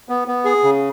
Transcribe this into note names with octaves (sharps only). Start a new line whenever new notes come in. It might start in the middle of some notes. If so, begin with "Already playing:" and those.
B3
B3
G#4
C#3